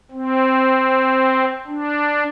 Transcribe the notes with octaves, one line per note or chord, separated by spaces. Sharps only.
C4
D4